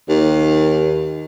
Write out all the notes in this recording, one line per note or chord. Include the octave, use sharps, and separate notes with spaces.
D#2